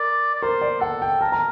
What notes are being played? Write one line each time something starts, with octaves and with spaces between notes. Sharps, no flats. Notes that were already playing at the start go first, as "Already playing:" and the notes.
Already playing: A#4 D5
D5
A#4 C5
D5
A4 F#5
G5
A#4 A5
A#5